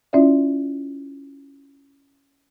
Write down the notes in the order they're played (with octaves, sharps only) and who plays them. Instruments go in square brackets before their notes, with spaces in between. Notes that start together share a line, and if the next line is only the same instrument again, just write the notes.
[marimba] C#4 E4 F4 D5 E5